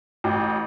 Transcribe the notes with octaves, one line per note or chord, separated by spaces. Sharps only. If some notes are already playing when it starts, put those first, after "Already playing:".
A1